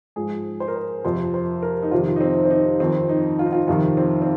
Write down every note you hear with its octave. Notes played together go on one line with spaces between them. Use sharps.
G#2 F3 G#4
C5
A#4
C5
F2 C3 F3 C5
C5
A#4
D#4
F2 C3 D#3 F4
D#4
C4
C4
D#4
F2 D#3 C4
D#4
F4
D#4
F4
F2 C3 D#3 F4
C4
C4